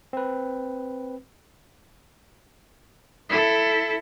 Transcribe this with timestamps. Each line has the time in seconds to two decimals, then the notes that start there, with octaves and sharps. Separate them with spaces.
0.13 C4 B4
3.29 E4 A4